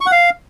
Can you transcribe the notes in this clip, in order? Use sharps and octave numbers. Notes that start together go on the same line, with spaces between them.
C#6
F#5
F5